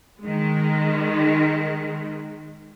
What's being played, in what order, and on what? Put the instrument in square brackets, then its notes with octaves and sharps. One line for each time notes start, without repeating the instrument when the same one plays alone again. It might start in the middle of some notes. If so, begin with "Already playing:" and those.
[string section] D#3 G#3